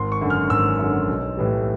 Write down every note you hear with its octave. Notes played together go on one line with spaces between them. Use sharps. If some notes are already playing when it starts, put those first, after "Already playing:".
Already playing: G#1 C6
C#6
F#2 D3
F6
G#1 E6
F#2 D3
B1
A2 E3 G3